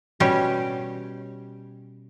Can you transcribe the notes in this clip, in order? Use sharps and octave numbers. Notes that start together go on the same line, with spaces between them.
B2 G3 C#4 G4